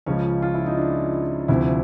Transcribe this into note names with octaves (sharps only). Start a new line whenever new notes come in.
C#2 C#3 F3 G#3 C#4
F4
E4
D#4
D4
D2 C3 F3 E4